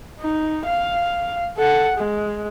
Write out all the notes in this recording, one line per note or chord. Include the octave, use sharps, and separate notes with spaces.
D#4
F5
A4 F#5
G#3